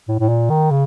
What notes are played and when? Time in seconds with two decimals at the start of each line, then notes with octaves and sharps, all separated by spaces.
0.08 A2
0.19 A2
0.29 A#2
0.50 D#3
0.71 C#3